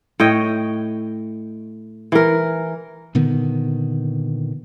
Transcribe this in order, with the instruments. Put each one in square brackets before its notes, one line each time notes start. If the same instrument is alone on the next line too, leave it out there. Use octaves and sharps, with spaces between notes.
[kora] A2 C#5 D#5 G5
E3 A#4
[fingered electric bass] A#2 D3 D#3 B3